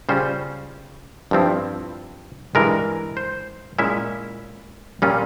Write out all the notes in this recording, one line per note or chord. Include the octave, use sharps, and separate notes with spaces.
C#3 G3 C#4 F4 C5
G2 F3 C4 E4
G2 E3 G#3 A#4
C5
A#2 G#3 C#4 E4 E5
A#2 G3 C#4 F4